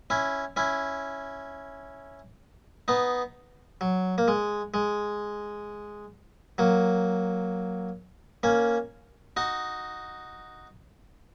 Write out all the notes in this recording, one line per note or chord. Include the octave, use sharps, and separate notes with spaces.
C#4 E4
C#4 E4
B3 D#4
F#3
A#3
G#3
G#3
F#3 A#3
A#3 C#4
D#4 F#4